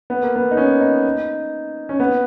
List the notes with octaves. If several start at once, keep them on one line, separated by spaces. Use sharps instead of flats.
B3
A#3
B3
D#4
C#4
D#4
C#4
B3